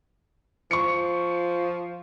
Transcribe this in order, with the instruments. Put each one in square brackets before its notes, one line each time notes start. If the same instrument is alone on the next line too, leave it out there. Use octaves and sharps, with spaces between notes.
[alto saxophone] F3 [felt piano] C#6 C#7